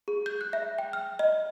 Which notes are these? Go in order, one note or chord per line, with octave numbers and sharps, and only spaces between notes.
G#4
G6
F#6
E5
G5
F6
D#5